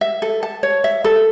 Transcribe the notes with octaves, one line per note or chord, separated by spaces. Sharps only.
E5
A4
A5
C#5
E5
A4